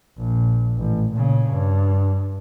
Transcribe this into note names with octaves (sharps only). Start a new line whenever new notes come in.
A#1
A1
A#2 C#3
G2